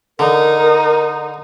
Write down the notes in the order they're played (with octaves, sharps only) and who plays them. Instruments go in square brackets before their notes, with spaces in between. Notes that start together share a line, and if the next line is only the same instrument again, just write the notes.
[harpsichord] D3 [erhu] D#4 [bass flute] A#4